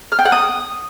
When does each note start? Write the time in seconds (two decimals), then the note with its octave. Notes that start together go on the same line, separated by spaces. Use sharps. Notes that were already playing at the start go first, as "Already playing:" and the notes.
0.12 F6
0.19 G5
0.25 F#5
0.32 D#6